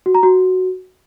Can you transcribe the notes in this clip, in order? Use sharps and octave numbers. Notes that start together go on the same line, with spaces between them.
F#4
A#5
F#4